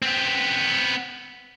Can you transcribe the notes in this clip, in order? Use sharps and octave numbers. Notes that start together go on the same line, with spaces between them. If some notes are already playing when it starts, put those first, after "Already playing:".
B3 C4